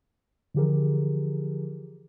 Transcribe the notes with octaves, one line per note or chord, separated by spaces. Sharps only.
D3 E3 F3 G4 G#4 A#4